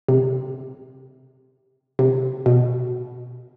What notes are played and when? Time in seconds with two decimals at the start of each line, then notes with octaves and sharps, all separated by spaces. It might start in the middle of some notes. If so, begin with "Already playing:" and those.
0.08 C3
1.99 C3
2.46 B2